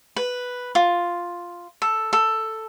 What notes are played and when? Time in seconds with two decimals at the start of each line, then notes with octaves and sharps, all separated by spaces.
0.16 B4
0.75 F4
1.82 A4
2.13 A4